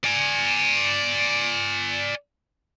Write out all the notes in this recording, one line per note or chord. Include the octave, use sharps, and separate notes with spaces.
D5 G#5